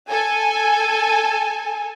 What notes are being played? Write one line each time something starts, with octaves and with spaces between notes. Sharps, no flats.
A4 G#5